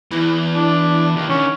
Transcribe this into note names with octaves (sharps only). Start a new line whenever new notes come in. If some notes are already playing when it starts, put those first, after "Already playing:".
E2 E3 E4
D4
D#2
D3 D#3 C#4